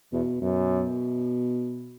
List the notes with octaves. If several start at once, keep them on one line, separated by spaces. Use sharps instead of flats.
E2 B2
F#2 B2